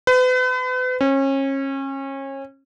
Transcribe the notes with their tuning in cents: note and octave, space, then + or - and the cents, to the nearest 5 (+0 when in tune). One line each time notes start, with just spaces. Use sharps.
B4 +40
C#4 -30